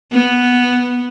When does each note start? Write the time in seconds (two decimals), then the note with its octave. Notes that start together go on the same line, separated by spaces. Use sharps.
0.12 B3